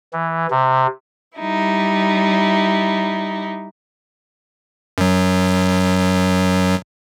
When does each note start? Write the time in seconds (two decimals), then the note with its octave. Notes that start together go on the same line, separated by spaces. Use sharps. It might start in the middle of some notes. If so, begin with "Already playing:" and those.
0.13 E3
0.50 C3
1.37 G3 D#4 E4
4.98 F#2 F#3